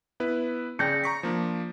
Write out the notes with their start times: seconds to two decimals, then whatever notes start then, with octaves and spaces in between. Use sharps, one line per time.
0.20 B3 E4 B4
0.79 C#3 D5 G5 G6 A#6 C#7
1.04 A#5 C#6 B6
1.23 F3 A#3 D4